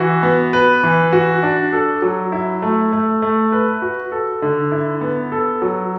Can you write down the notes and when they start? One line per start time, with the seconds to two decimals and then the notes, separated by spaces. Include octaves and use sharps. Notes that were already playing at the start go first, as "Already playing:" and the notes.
Already playing: E3 F#4
0.23 B3
0.53 B4
0.83 E3
1.13 F#4
1.43 D4
1.73 A4
2.02 F#3
2.32 E4
2.62 A3
2.93 A3
3.22 A3
3.52 B4
3.82 F#4
4.12 A4
4.42 D3
4.72 E4
5.01 B3
5.32 A4
5.62 F#3